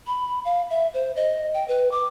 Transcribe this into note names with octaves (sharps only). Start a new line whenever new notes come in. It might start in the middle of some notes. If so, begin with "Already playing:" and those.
B5
F5
E5
C5
D#5
G5
B4
D6